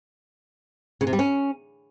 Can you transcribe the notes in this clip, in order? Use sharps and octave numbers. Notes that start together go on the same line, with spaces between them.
C#3
C3
G3
C#4